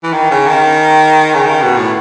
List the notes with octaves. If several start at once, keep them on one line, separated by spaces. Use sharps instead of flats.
E3
D#3
C#3
D#3
C#3
D#3
B2
A2